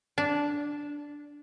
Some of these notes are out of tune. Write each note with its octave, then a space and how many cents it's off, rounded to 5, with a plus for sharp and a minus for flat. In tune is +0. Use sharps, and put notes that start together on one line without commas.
D4 -10